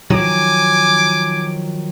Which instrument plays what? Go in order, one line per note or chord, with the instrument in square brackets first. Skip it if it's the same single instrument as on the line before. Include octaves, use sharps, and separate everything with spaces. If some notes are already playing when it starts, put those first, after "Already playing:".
[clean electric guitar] D#3 F3 F#3 [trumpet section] G#5 D6